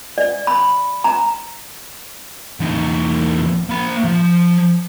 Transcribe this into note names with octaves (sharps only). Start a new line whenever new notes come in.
D5
B5
A#5
E2 D#4
A#3 B5
F3